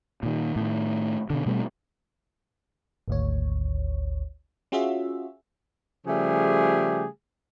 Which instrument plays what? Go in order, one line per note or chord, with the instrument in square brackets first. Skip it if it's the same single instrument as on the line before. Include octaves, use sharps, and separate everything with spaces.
[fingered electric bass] A#2 D#3
A2 D#3
B2 D3
B2 G3 A3 C4
[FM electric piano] G#1 D2 C#5
C#4 F4 F#4 G#4 E5
[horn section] C#3 F3 G3 A3 G4 G#4